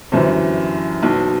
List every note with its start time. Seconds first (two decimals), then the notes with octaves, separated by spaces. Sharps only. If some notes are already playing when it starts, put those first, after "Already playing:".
0.12 G1 F#2 E3 C5
1.03 B1 B2